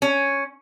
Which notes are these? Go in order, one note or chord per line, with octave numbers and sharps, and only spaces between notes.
C#4